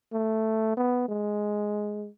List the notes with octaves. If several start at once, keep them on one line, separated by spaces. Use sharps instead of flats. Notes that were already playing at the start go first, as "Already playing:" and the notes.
A3
B3
G#3